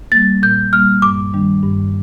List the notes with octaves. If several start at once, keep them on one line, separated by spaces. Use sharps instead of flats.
G3 A#3 A6
A#2 G6
G3 A#3 F6
G2 D6
D#3 G3 D4
G2